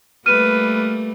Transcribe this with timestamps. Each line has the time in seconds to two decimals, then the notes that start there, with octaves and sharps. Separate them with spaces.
0.26 G3 A3 A#3 B4 F6 D#7